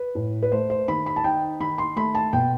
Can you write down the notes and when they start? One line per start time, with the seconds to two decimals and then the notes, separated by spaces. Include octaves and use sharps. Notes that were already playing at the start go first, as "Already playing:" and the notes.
Already playing: B4
0.15 A2
0.42 B4
0.52 A3 C5
0.70 C5
0.88 D#3 B5
1.06 B5
1.16 A5
1.24 D#4 G5
1.60 D#3 B5
1.78 C6
1.96 A3 B5
2.15 A5
2.33 B2 G5